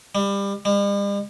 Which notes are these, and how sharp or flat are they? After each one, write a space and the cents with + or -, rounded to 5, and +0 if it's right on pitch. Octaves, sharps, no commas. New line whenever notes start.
G3 +25
G3 +45